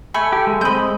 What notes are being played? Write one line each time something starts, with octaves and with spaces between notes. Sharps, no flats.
A3 G#5 B5
G4
G#3
G#3 C4 D#5 B5 G6